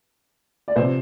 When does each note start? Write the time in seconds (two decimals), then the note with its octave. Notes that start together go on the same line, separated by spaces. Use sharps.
0.68 D5
0.76 C3 F3 C5